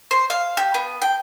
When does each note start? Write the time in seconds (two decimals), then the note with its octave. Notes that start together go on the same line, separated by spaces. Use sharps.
0.11 C5
0.30 F5
0.57 G4
0.74 B3
1.02 G5